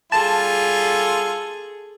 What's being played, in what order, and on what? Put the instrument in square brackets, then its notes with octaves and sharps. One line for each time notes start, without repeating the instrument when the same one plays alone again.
[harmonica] G3 F4 [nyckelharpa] G#4 A4 [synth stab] A5